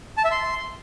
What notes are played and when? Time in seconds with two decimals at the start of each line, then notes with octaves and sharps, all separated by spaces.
0.17 A5
0.24 E5
0.31 C6